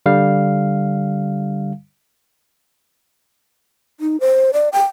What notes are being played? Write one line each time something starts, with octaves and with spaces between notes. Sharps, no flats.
D3 G3 F5
D#4
C5
D5
G5